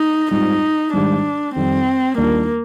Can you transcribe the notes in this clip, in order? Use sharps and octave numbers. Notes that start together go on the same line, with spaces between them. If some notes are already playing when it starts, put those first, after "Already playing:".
Already playing: D#4
G#2 G3 C4 D#4 F4
G#2 D#3 G3 D4
F2 D#3 G3 C4
D#2 D#3 G3 A#3 D4 F4